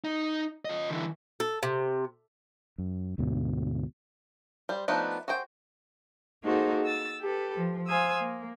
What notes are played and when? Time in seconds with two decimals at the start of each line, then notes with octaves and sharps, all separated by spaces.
0.04 D#4
0.65 F4 D#5
0.90 D3 E3
1.40 A4
1.63 C3
2.78 F#2
3.18 D2 G#2 B2 D3
4.69 G3 C5
4.88 F3 A3 B3 D4 D#4
5.28 F#4 G#4 C5 G5
6.43 A#3 D#4 F#4 G#4 A4 C5
6.83 E6 A6
7.21 G4 A4 B4
7.55 F3
7.87 C5 F5 G#5 D#6 E6
8.20 A#3